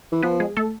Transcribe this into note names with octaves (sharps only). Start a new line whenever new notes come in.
E3
F3 B3 B4
G#3 G#4
A3 A4